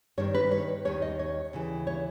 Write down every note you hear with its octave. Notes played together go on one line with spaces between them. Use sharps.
G2 D#3 C#5
B4
C#5
D#2 D#3 C#5
D#5
C#5
D#2 C#3 E3
C#5